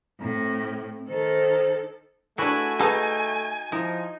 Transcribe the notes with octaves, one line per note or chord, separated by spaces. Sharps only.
A2 C4
D#3 A4 C5
E3 G#3 A3 D4 E4 F#4 G#5
D#4 G#4 A4 B4
F3 D#4 E4